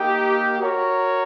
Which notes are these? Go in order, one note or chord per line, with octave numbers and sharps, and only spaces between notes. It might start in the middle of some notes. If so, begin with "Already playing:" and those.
Already playing: A#3 D#4 G4
F#4 A#4 C#5